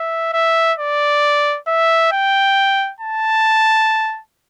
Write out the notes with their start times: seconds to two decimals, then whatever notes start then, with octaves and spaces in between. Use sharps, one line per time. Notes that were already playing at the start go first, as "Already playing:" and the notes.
Already playing: E5
0.33 E5
0.78 D5
1.67 E5
2.12 G5
3.00 A5